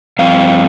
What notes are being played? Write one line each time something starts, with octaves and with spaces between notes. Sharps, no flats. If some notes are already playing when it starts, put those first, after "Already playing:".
G2 F3 C4 F5